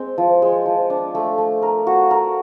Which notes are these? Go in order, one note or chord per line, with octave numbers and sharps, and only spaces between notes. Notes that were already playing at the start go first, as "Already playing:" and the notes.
Already playing: G#3 C4
F3
G#3
F3
D4
A3
A3
A#4
F#4
A#4